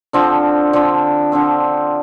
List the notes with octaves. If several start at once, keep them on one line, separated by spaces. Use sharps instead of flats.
D3 F3 C4
D3 F3 C4
D3 F3 C4